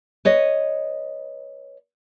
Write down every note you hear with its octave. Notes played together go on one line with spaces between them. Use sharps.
B4 C#5 D#5